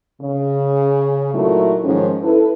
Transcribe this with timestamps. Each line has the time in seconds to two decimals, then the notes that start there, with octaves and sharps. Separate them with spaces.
0.22 C#3
1.34 A#2 F#3 A3 D#4 E4 A#4
1.84 G#2 D#3 F3 C#4
2.23 E4 A4 B4